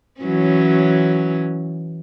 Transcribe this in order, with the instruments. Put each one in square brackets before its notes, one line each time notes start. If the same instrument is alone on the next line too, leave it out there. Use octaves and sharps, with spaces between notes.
[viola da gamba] E3 F#3 C#4